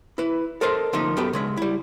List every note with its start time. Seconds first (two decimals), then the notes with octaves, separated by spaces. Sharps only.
0.18 E4 B4
0.61 A4 A#4 C5 D#5 A5 C6
0.93 D3 F3 A3 A#3 D#4
1.17 F#2 A3 B3 G4 A4 B4
1.33 C#3 G#3 E5
1.57 G3 E4